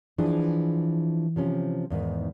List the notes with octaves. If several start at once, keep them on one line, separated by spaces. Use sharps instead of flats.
E3 F3 D4 G#4
C3 F3 C#4
E2 G#2 D#3